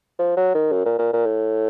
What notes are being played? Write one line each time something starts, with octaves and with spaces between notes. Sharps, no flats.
F3
F#3
D#3
F#2
A#2
A#2
A#2
A2